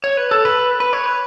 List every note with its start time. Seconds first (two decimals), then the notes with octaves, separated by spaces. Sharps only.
0.04 C#5
0.17 B4
0.31 A4
0.45 B4
0.80 B4
0.93 C#5
1.06 B4